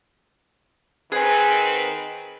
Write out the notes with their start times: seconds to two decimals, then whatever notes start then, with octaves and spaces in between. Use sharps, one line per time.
1.12 D#3 C4 G#4 B4 F#5 G#5